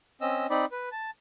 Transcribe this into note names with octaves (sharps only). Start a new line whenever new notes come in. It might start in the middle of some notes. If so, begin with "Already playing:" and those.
C4 C#4 D#5 E6
C4 D#4 D5 B5
B4
A5